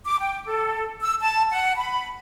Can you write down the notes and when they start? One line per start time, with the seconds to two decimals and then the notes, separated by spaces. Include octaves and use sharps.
0.05 D6
0.19 G5
0.46 A4
1.01 E6
1.21 A5
1.51 F#5
1.77 B5